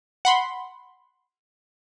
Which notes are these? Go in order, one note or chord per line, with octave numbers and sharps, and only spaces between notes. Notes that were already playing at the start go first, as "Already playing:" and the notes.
F#5 B5 C6